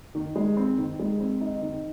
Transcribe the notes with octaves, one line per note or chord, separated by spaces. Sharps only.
D#3
G#3
C4
D#3
G#3
C4
D#4
D#3